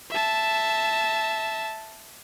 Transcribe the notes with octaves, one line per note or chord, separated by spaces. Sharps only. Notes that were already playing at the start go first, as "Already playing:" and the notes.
E5 A5